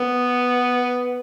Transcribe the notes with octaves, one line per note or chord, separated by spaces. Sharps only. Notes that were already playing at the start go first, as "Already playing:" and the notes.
Already playing: B3